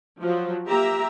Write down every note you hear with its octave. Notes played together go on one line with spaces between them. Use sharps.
F3 F#3
A#3 G4 E5 A#5